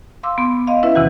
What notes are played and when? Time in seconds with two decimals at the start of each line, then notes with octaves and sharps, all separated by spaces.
0.23 F5 C6 D6 E6
0.38 B3 C6
0.67 D#5 F5 C6
0.83 C#4 E4 B4 E5
0.95 E2 C3 D#3 E3 F#4 F#5